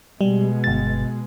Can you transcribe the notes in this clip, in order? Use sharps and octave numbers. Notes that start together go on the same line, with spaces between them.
B2 G3 G#3
G1 A6